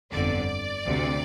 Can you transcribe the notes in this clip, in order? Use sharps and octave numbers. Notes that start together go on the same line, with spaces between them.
G1 F2 D3 D5
D2 C3